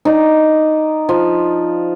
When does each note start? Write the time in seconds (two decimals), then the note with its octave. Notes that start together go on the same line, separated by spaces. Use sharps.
0.05 D#4 D5
1.09 F3